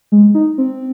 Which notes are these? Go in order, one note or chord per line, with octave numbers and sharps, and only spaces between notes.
G#3
D#4
C4